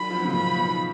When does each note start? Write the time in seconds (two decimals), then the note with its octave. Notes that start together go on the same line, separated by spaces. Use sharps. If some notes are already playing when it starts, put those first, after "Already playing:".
Already playing: D#3 F#3 B5
0.10 F3
0.17 F#3
0.25 C#3 F3
0.33 B2 D#3 B5
0.56 G#2 B2